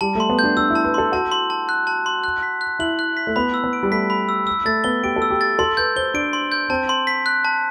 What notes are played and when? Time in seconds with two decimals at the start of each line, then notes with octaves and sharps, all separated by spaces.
0.01 G3 A5
0.15 A3 C6
0.29 B3
0.39 G6
0.44 D4
0.57 D4 E6
0.70 E4
0.75 A5
0.84 B4
0.94 A4 C6
1.12 F#4 A5
1.31 C6
1.50 A5
1.69 F#6
1.87 A5
2.06 C6
2.24 F#6
2.43 B6
2.61 F#6
2.79 E4 F#7
2.99 F#6
3.17 B6
3.27 A3
3.36 B3 B5
3.54 E6
3.64 B3
3.73 D7
3.83 G3
3.91 A3 B6
4.10 B5
4.29 E6
4.47 E6
4.65 A3 A6
4.84 B3 G7
5.04 G4 D7
5.16 A4
5.22 E6
5.30 G4
5.41 A6
5.59 A4 C6
5.77 B4 G6
5.96 C5 G7
6.14 D4 D7
6.33 C6
6.52 G6
6.70 C4 A5
6.89 C6
7.07 B6
7.26 F#6
7.45 A5